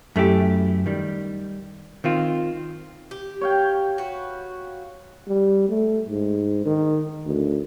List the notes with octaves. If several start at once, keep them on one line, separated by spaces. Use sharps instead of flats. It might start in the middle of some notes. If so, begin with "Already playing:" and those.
F#2 A3 E4 G4
D#3 G3
D#3 C4 F4
G4
C#5 F5 G5
F#4 B4
G3
A3
G#2
D#3
D2